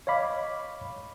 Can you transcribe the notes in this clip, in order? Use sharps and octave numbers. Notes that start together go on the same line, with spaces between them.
C#5 D#5 F5 B5 D6